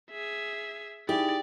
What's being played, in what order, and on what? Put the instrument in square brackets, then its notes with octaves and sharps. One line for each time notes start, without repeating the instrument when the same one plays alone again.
[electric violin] G#4 E5
[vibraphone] D#4 [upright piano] E4 G#4 [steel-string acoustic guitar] G4 [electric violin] D5